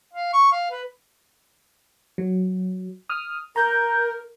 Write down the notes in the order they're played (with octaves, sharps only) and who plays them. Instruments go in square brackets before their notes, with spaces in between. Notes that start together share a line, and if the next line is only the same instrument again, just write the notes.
[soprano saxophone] F5
C#6
F5
B4
[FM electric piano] F#3
D#6 F6
[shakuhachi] A#4 [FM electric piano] A#5 G6